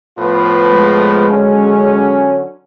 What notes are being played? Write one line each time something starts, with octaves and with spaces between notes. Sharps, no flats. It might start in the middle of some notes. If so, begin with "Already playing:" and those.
A2 F3 B3 F4 B4
G#3
D3 F#3 C#4